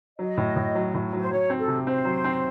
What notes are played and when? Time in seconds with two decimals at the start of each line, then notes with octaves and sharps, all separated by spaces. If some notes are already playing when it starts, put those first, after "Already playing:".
0.19 F#3 D#5
0.37 A2
0.56 A2
0.75 F#3
0.94 A2
1.13 F#3
1.20 C5
1.31 F#3 C#5
1.50 C4
1.59 A4
1.68 C3
1.87 C4 C5
2.05 F#3
2.24 C4